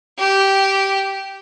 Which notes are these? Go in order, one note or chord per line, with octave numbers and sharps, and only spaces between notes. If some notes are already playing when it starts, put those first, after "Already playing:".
G4